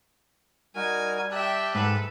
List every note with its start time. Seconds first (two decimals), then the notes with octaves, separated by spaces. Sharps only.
0.76 G3 D#4 F#4 A#4 G#5
1.31 G4 E5 G5 A5 F#6
1.75 G#2 A4 B4